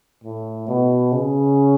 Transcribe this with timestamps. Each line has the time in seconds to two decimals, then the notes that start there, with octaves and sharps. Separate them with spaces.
0.24 A2
0.68 B2
1.12 C#3